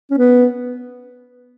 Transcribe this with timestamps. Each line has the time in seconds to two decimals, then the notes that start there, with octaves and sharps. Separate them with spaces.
0.11 C#4
0.18 B3